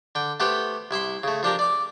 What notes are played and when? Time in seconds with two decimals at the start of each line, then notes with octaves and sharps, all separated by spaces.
0.15 D3 G5
0.40 A3 B3 G4 B4 C5 G5
0.91 C2 E4 E5 C6
1.23 C#3 A3
1.43 F3 D4 G4 A#4
1.59 D5 D6